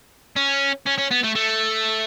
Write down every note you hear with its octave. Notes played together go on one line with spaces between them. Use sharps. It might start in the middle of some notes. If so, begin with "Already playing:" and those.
C#4
C#4
C#4
B3
A3
A3